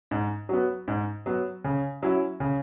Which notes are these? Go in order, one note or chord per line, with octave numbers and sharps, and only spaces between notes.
G#2
F#3 B3
G#2
F#3 B3
C#3
F#3 C#4 E4
C#3